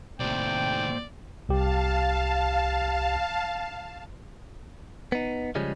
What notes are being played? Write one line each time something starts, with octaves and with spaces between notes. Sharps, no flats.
D#2 A2 C3 C5 D5 G5
C2 G4 F5 A5
B3 D#4
C#3 F3 G3 G#3 C#4